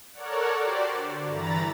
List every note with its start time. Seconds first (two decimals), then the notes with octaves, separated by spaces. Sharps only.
0.13 A4 A#4 C#5 D5 F#5
0.59 F#4 G4 C5 D5
0.91 D3
1.27 G2 E3 A#5 B5 A6